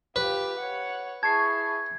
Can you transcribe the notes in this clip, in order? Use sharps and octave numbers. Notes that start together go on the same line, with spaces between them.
F4 G4 B4
C#5 F#5
E4 G#4 A5 C#6 G#6 C7